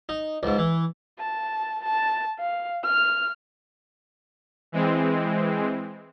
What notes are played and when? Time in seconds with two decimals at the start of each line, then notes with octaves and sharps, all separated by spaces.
0.09 D#4
0.43 C#2 G#2
0.58 E3
1.19 A5
1.85 A5
2.40 F5
2.85 F6
4.72 E3 G#3 C4